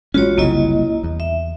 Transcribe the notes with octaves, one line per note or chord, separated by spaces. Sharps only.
A1 G#3 C#4 F4 F#4 C#5
F#1 C2 C#3 A#3 E4 D#5
E2
E5